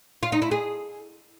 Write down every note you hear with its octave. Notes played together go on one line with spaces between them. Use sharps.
F4
D#4
E4
G#4